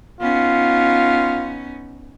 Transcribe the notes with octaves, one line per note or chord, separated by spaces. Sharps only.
B3 C#4 D#4 F4